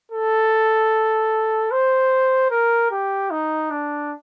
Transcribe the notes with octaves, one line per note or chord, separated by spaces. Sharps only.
A4
C5
A#4
G4
D#4
D4